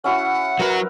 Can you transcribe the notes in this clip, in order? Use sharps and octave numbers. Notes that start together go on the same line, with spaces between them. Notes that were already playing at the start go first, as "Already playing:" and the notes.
C#4 E4 F#4 F#5
F#3 F#4 A#4 B4